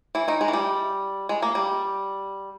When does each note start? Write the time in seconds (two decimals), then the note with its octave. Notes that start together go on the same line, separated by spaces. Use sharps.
0.15 E3 E4
0.28 D#3 D#4
0.41 G#3
0.48 E3
0.53 G3
1.29 G#3
1.42 A#3
1.55 G3